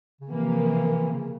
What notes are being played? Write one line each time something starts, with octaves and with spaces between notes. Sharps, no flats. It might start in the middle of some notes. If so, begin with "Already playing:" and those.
C#3
C3 E3 F3 A#3
C#3